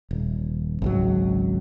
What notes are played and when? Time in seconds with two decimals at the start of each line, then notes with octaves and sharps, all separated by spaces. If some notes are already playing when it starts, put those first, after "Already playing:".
0.11 D#1
0.82 G#1 C#2 F#3